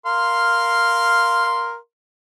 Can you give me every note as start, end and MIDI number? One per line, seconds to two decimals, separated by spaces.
0.06 1.76 70
0.06 1.76 77
0.06 1.76 84